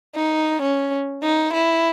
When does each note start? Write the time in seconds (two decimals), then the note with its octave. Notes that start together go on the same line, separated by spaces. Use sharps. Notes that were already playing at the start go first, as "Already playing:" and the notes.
0.16 D#4
0.62 C#4
1.24 D#4
1.54 E4